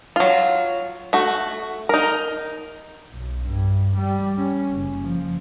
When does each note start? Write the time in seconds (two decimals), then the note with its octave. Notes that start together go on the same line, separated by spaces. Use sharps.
0.16 F#3 F4
1.13 A3 F#4
1.89 D#4 A#4
3.12 B1
3.45 G2
3.98 G3
4.37 C#4
4.72 F#1
5.03 F3